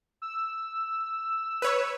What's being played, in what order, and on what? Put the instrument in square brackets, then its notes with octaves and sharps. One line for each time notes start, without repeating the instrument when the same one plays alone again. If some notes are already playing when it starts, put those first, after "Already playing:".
[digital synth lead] E6
[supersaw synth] B4 C#5